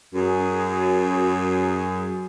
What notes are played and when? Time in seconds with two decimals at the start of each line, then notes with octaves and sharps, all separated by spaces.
0.15 F#2 G#4